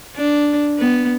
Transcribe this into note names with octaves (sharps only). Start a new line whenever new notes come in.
D4
B3